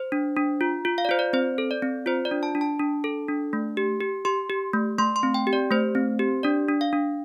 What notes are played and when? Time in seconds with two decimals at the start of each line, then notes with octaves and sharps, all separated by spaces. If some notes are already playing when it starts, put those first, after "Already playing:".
Already playing: C5
0.12 D4
0.36 D4
0.61 F4
0.85 F4
0.98 F5
1.05 D5
1.09 F4 C5
1.19 D5
1.33 C4 C5
1.58 A4
1.71 D5
1.82 C4
2.06 F4 C5
2.25 D5
2.31 D4
2.43 A5
2.55 D4
2.61 A5
2.79 D4
3.04 A4
3.28 D4
3.53 A3
3.77 G4
4.01 G4
4.25 G4 C6
4.50 G4
4.73 A3
4.98 A3 C6
5.16 C6
5.23 C4
5.34 G5
5.47 G4
5.53 D5
5.71 A3 C5
5.95 C4
6.19 G4
6.43 D4 D5
6.69 D4
6.81 F5
6.93 D4